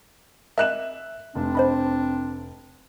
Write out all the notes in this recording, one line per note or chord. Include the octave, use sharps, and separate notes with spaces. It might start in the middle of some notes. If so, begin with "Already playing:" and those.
A#4 D#5 E5 D6 F#6 E7
F1 C4 D4
C5 D#5 B5